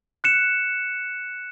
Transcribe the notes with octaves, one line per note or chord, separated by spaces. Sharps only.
F#6 C#7 E7